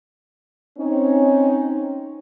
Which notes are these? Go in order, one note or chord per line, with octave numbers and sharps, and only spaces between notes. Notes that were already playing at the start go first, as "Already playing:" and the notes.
C4 C#4 D#4